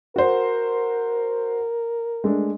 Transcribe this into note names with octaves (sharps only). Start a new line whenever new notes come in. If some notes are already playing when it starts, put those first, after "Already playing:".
F#4 A#4 C5
G#3 A3 D4